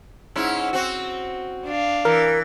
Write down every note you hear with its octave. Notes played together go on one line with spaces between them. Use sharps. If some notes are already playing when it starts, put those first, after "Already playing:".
G#2 C#4 E4
C4 F#4
D4 F5
E3 A#4